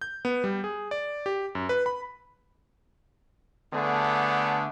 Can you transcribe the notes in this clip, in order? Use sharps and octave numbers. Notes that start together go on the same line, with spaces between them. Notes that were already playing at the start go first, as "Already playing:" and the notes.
G6
B3
G3
G#4
D5
G4
F#2
B4
B5
D3 A3 B3 D4 G#4